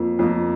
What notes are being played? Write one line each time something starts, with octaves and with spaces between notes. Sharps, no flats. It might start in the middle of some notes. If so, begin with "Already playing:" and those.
Already playing: F2 F3 A#3
F2 F3 A#3